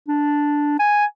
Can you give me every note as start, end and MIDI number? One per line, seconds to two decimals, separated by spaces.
0.08 0.76 62
0.79 1.05 80